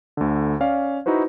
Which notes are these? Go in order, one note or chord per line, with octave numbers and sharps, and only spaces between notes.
D2 D3
C#4 D5 F5
D#4 E4 F#4 B4 C5